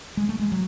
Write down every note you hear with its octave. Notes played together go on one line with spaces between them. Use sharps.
G#3
A3
G#3
F#3